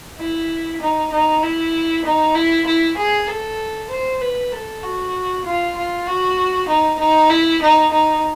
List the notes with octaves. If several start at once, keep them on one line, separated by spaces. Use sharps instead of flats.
E4
D#4
D#4
E4
D#4
E4
E4
G#4
A4
C5
B4
A4
F#4
F4
F4
F#4
D#4
D#4
E4
D#4
D#4